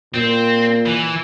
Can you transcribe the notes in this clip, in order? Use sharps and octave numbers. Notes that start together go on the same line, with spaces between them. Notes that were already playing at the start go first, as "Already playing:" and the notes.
A#2 C4
E3